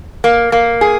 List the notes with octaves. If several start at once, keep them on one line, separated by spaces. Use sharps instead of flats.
A#3
A#3
G#4